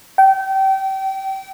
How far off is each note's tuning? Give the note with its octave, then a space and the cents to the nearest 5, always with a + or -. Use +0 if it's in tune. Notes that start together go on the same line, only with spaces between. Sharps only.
G5 -30